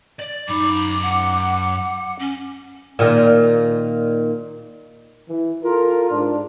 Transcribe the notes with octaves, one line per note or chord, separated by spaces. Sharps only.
D5
F#2 D#4 B5 D6
F#5
C#4
A#2 D#3
E3
F4 A4 A#4
G#2 D4